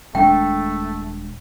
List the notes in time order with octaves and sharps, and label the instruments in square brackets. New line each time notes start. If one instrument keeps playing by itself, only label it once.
[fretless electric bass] D#1 G#3 D4 [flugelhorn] A3 [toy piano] G5